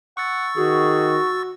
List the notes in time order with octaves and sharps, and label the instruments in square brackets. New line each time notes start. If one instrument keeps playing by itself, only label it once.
[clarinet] F#5 [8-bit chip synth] C#6 E6 A6
[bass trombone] D#3 [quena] F#4 [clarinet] G#4